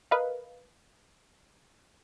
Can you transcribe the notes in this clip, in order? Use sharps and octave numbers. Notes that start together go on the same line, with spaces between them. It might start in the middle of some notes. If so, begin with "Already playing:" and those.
A#4 B4 D#5 F5